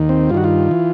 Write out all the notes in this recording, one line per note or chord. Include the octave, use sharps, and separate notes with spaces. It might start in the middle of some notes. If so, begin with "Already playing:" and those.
Already playing: D#2 D#3
C4
G2 D#3 F4 F#4
F4
E3